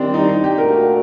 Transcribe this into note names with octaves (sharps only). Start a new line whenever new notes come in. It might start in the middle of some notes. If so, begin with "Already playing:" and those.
Already playing: D#3 G3 C4 D4
D#4
D#4
G4
A#2 A3 D4 F#4 A#4